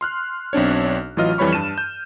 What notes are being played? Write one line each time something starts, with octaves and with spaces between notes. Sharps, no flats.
C6 F6 F#6
B1 C4 D4 C#5
A1 E3 F#3 F4 D#5 F6
F2 E3 G3 C#5 B5 C#6
G2 A5 D#7 E7
G6